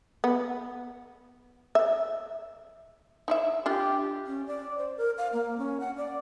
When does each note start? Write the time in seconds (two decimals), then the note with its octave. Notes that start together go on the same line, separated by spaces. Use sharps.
0.24 B3
1.75 E5
3.28 D#4 E4 E5
3.66 D4 F4 G4
4.27 C#4
4.47 D5
4.78 C5
4.97 A#4
5.18 F5
5.33 A#3
5.58 C#4
5.80 F#5
5.97 D5